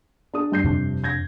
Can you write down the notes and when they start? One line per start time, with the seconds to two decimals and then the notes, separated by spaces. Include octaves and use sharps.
0.34 D4 G#4 D#6
0.52 G2 G6 C7
0.64 F2 C3 D4
1.04 G6 G#6 A#6